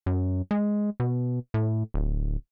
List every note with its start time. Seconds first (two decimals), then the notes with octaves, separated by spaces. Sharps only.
0.06 F#2
0.51 G#3
1.00 B2
1.54 A2
1.94 D1